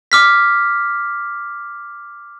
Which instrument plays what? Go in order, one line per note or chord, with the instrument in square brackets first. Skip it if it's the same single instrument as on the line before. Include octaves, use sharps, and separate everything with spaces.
[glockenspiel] D6 F6 B6